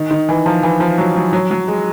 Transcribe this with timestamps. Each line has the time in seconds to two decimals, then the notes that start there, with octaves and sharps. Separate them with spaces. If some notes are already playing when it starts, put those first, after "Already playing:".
Already playing: D#3
0.11 D#3
0.29 E3
0.46 F3
0.63 E3
0.80 F3
0.98 F#3
1.16 F#3
1.33 F#3
1.51 F#3
1.68 G#3